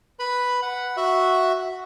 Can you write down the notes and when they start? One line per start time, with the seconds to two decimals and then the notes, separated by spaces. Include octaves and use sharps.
0.19 B4 B5
0.62 F#5
0.97 F#4 E5